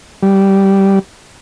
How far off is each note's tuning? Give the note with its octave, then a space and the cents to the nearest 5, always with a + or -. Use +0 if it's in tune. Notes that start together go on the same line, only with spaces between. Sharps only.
G3 -10